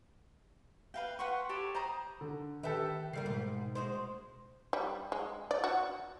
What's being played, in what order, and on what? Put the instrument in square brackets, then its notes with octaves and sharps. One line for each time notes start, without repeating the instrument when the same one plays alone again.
[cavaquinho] B4 F5 G5
B4 F#5 C6 C#6
G4 A4 C#5 B5
C5 A#5 B5 D#6
[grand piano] D3
[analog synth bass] D#3 [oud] G4 E5 [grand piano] A4 B4
[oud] G2 G3 A#3 [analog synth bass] C#3 [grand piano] C7
[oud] G#2 [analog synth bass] B2
[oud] D2 G#3 C5
[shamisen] G3
G#3
D5
F#4